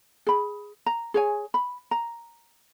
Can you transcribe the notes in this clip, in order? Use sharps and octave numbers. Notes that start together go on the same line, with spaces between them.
G#4 B5
A#5
G#4 C#5 G#5
B5
A#5